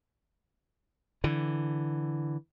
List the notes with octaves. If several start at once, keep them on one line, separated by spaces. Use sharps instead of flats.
D3 E3